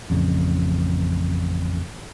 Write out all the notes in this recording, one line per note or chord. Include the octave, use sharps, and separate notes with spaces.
A1 F2 C#3